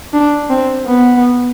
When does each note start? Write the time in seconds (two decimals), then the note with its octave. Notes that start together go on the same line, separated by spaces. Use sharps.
0.13 D4
0.50 C4
0.87 B3